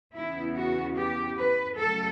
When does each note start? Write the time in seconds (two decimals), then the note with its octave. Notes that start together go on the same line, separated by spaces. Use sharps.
0.14 E2 C#3 E3 B3 E4
0.56 F#4
0.96 G4
1.38 B4
1.78 C#3 F#3 A3 A4